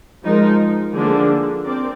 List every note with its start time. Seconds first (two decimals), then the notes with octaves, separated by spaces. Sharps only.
0.23 F3 G#3 D#4 A#4
0.94 D3 F3 A#3 D4 G#4
1.64 C4 A#4 D5